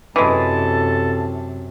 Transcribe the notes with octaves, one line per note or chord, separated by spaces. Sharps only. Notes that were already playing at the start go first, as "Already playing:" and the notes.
F#2 C3 E3 G#3 A4 A5